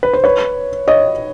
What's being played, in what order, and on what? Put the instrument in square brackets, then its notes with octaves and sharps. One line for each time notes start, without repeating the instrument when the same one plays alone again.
[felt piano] B4
C5
B4 C#5
C#5 D#5